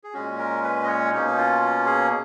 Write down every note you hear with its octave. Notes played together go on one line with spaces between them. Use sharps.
G#4
A#2 G#3 C#4 F#4
A#4
B4
D#5
C#5
B2 A#3 C#4 D#4
D#4
F4
F4
G#4